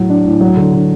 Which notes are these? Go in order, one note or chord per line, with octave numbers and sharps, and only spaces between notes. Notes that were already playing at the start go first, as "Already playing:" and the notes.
Already playing: A2 F#3
D4
A2
F#3
D3
D3